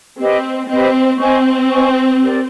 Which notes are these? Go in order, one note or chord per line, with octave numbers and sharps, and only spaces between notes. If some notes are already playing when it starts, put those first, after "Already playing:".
C4 G4 B4 D#5
C4 G4 B4 D#5
C4 C5 D#5 G#5 C#6
C5 D#5 G#5 C#6
G4 A#4 D5